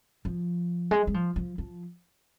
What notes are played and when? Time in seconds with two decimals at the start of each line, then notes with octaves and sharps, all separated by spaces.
0.25 F3
0.91 G#3
1.07 G#3
1.14 F3
1.36 F3
1.58 F3